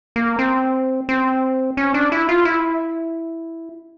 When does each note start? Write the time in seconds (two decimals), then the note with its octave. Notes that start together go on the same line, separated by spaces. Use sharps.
0.16 A#3
0.39 C4
1.09 C4
1.77 C#4
1.94 D4
2.12 E4
2.29 F4
2.45 E4